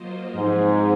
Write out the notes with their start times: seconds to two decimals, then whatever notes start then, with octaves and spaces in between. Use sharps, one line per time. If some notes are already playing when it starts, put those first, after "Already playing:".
Already playing: F#3 A#3 F4 C5 D#5
0.35 G#2 F3 C4 D#4 G#4